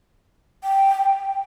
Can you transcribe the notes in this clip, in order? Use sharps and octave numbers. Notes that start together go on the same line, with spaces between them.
G5